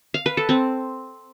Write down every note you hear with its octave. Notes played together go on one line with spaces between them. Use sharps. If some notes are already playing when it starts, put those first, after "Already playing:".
F5
B4
A4
C4